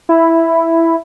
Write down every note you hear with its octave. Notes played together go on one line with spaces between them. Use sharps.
E4